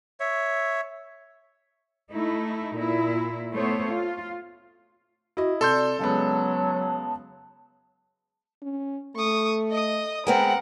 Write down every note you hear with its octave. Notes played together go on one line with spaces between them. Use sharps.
C#5 E5
A3 D#4 E4
A#2 E4
A3 B3 C5 C#5
F4
E4 F#4 D#5
C3 A4 D5 C6 G6
C#3 F#3 G#3 B3 A5
C#4
A3 C#6 D#6
D#5 D#6
G#3 B3 C4 A#4 F#5